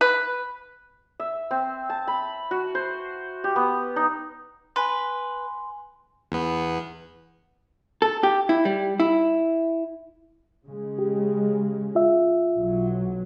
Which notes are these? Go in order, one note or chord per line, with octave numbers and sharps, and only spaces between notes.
B4
E5
C4
A5
B5
F#4
C5
G4
B3
D#4
B4 G#5 C6
E2 B3
A4
G4
E4
G3
E4
C#3 G#3
G4
F4 E5
B1 F#3